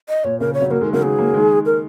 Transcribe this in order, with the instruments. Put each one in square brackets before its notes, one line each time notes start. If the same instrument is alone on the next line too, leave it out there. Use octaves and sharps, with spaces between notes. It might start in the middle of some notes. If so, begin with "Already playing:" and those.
[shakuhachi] D#5
[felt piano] A#2 [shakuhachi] C#5
[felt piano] C#3 [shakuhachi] A#4
[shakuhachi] C#5
[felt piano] C#3 F#3
[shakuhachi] C#5
[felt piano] F#3 A#3 [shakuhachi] A#4
[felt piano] D#3 G#3
[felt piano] C#3 F#3 [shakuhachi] A#4
[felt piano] D#3 G#3 [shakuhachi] G#4
[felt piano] F#3 A#3
D#3 G#3
[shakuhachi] A#4